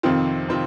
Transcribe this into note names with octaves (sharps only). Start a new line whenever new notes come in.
F2 C3 D#3 C4 F4
C3 D#3 C4 F4